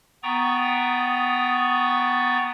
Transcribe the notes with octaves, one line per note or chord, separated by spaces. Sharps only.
B3 G5 A#5 C#6 D#6 A6